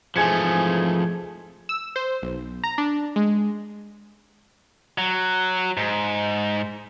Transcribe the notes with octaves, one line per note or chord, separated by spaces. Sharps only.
G#2 E3 F3 A3 G#4 G#5 G#6 C#7
E6
C5
B1
A#5
D4
G#3
F#3
G#2